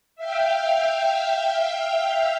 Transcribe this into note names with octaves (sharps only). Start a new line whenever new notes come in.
E5 F5 G5